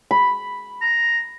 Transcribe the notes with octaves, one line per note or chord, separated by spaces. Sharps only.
B5
A#5